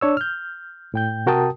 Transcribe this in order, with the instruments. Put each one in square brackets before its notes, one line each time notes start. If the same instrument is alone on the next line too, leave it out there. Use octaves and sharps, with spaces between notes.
[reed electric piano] D4 C#5 E6
F6 G6
A2 G5 G6
C3 F#4 A#4 G5 A5 D#6